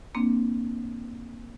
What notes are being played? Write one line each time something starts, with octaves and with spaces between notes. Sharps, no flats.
A#3 C4 D4